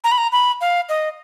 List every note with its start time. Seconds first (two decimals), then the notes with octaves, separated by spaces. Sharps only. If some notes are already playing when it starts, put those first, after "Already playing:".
0.04 A#5
0.12 B5
0.18 A#5
0.32 B5
0.61 F5
0.89 D#5